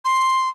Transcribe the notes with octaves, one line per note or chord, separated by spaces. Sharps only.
C6